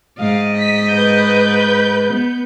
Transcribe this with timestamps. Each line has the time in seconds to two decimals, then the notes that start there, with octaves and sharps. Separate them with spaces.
0.19 G#2 D#5 F5
0.57 B6
0.93 B4 G6
2.13 B3